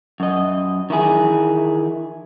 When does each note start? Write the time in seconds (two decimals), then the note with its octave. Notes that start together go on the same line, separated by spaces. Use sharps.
0.20 F#2 D#5
0.90 D#3 E3 E4 G#4